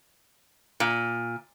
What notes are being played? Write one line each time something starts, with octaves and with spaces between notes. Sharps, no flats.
A#2